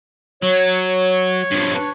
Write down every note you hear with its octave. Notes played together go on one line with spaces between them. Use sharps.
F#3 C#5
G2 F3
D4 B4 C#5